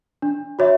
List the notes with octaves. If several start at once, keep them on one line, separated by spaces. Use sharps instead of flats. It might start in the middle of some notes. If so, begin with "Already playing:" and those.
D4
F#4 C#5 E5